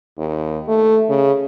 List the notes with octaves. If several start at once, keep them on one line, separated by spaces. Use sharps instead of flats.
D#2
A3
C#3